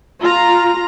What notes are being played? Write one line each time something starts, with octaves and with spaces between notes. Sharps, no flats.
F4 A#5